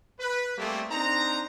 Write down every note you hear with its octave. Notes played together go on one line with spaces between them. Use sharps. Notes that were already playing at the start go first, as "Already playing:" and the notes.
B4
G3 A3 A#3 C4 G4 G#4
C4 D4 D#4 A#5